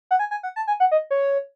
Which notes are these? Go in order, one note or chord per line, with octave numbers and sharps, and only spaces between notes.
F#5
G#5
G#5
F#5
A5
G#5
F#5
D#5
C#5